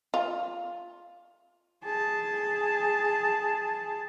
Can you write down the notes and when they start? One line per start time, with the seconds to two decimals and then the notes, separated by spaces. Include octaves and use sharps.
0.14 F4
1.84 G#4 A5